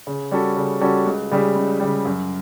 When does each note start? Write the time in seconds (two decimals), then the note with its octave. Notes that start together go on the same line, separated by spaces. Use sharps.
0.07 C#3
0.31 G3 C#4 F#4 A4
0.56 C#3
0.81 G3 C#4 F#4 A4
1.06 C#2
1.31 C#3 G3
1.56 C#2
1.80 C#3 G3
2.05 F#2